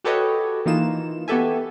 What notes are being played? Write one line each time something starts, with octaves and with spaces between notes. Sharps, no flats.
F#4 G4 A4 B4 C#5 D#5
E3 A#3 D#4 F4 E7
B3 F#4 G4 A4 E5 G#5